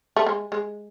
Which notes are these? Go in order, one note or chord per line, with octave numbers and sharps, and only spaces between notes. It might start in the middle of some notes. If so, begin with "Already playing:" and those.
A3
G#3
G#3